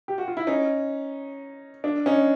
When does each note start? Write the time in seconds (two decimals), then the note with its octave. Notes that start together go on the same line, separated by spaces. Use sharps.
0.08 G4
0.18 F#4
0.28 F4
0.37 E4
0.47 C#4 D#4
1.84 D4
2.06 C#4 D#4